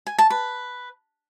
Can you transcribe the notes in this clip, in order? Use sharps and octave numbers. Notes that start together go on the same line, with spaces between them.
G#5
A5
B4